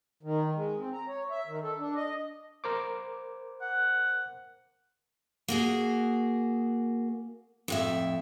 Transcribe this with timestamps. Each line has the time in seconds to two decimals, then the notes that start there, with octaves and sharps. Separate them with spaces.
0.23 D#3
0.55 G#3
0.79 C4
0.93 A#5
1.08 C#5
1.31 E5
1.47 D#3
1.63 A4
1.78 D4
1.96 D#5
2.64 A#4 C5 D6
3.61 F#5
5.48 A#3 F#4 G#4
7.68 F2 A2 E5